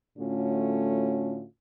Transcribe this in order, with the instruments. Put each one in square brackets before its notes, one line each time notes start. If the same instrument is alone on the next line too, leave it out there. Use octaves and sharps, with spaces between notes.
[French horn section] A2 D3 A3 C#4 F4 F#4